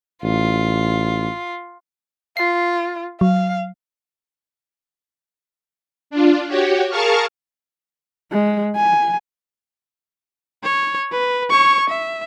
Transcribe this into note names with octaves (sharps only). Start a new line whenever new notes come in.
A1 F4
F4 C7
F#3 F5
D4 F4
F#4 G4 C#5
G#4 A#4 F5 A5 C#6 F6
G#3
G#5
C#5
B4
C#5 C#6
E5